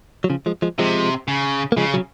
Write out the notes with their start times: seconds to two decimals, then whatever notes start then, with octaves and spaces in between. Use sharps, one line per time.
0.24 F#3
0.30 C#3 F3
0.46 F3 G#3
0.62 F3 G#3
0.79 C3 F3 G#3
1.28 C#3
1.72 A#3
1.77 C#3 F3 G#3
1.94 F#3